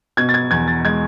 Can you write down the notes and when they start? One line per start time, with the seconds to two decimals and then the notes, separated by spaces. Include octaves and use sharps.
0.17 B2 G#6
0.29 A6
0.34 G#6
0.51 E2 G#6
0.68 A6
0.84 G#3 G#6